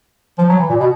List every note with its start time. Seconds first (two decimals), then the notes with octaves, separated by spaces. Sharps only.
0.38 F3
0.49 F#3
0.59 E3
0.70 A#2
0.80 B2